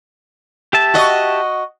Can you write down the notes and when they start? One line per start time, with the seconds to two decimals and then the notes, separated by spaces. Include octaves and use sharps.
0.73 G4 E5 A5
0.94 F#4 D#5